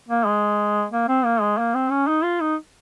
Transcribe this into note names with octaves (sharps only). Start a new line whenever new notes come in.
A#3
G#3
A#3
C4
A#3
G#3
A#3
C4
C#4
D#4
F4
D#4